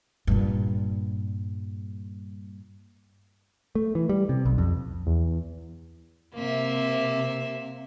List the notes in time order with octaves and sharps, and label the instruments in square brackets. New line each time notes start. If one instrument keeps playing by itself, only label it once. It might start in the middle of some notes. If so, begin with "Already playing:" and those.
[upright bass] G2 A#2
[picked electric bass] A3
E3
G3
C3
B1
F2
[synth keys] E2
[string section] C3 [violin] A#3 E5